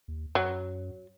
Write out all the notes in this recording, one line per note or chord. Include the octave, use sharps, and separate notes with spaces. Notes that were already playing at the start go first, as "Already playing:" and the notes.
D#2
F#2 F#3